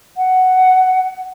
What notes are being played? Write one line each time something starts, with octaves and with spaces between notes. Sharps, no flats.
F#5